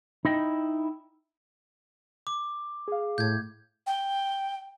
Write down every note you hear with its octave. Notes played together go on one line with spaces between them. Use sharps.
D#4 E4 D#5 G5
D6
G#4 F5
A2 G6 G#6
G5